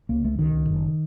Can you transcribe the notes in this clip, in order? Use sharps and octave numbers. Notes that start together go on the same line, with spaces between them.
C#2 A#3
C#2 A3
C#2 D#3
C#2
F#1